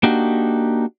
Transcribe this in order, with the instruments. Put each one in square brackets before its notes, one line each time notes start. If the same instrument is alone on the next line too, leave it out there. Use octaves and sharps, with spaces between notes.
[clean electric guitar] A#3 D4 D#4 F#4 G4